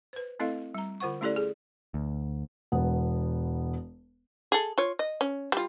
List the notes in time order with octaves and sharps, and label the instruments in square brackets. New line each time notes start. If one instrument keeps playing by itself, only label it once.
[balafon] B4 C5
A3 C4 E4 A4 D#5 F5
G3 A#5
D3 F4 C5 F#5 C#6
A3 C#4 E4 G4 A4 D5
G#4
[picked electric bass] D2
[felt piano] E1 B3
[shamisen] G#4 A4
F4 C#5
D#5
C#4
G3 F4